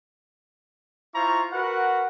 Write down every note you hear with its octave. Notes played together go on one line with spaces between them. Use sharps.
E4 F4 C5 A#5 C#6
F#4 A#4 B4 F#5